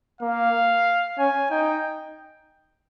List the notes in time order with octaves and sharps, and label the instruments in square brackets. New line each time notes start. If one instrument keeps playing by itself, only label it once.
[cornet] A#3 [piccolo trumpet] F5
[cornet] C#4 [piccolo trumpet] G#5
[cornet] D#4 [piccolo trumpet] G5